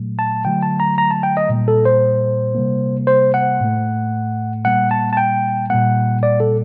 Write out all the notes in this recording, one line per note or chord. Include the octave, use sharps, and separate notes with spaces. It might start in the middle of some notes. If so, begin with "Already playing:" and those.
Already playing: A#2 F#3 A3
A5
D3 F#3 A3 G5
A5
A#5
A#5
A5
G5
D#5
A#2 G3 A#3
A4
C5
C3 G3 A#3
C5
F#5
A2 A3
A#2 G3 A#3 F#5
A5
A5
G5
A#2 G3 A#3 F#5
D5
A4